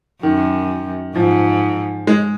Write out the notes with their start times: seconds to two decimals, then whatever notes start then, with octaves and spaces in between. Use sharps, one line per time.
0.23 F#2 D#3
1.15 G#2 F3
2.07 G#3